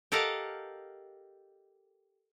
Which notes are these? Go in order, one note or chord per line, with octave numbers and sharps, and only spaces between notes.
G4 A4 A#4 D#5 F5 F#5